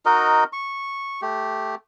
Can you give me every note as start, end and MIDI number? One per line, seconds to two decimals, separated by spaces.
0.05 0.44 63
0.05 0.44 66
0.05 0.44 70
0.05 0.44 75
0.53 1.21 85
1.22 1.75 57
1.22 1.75 67